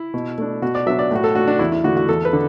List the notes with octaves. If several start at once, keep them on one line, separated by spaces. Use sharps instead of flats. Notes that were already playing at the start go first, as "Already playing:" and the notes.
Already playing: E4
B2
A3 D4
B2 F#4
D5
F#3 B3 D4 E5
D5
A2 F#4
A4
A3 D4 F#4
D4
E2 E4
E4
D3 A3 D4 F#4
F#4
E2 A4
B4
D3